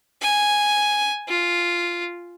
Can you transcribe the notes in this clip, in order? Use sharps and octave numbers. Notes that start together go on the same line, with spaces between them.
G#5
F4